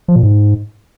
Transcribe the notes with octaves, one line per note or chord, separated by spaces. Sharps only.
F3
A#2
G#2